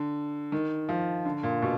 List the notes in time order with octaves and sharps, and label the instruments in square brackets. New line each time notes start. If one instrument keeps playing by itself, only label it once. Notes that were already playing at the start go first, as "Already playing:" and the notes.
Already playing: [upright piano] D3
D#3
F3
D3
A#2
B2